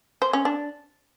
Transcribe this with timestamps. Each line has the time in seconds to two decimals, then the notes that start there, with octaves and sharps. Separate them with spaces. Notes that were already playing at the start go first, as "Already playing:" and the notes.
0.22 C5
0.33 C#4
0.45 D4